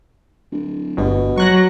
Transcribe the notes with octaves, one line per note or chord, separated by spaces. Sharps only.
D1
G1 B2
F#3 C#6 F#6 A#6